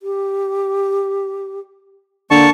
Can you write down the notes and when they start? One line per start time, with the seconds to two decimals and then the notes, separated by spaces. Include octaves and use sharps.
0.03 G4
2.31 D3 A#3 A5 C#6